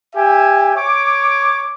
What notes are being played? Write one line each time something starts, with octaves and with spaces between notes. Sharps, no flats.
G4 E5 G#5
C#5 D6